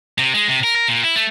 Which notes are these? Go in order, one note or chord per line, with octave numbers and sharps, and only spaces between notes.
C3
G#3
C3
A#4
A#4
A#2
E4
A3